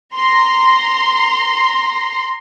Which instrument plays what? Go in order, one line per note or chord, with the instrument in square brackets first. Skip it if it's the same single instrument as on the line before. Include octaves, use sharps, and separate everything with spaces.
[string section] A#5 C6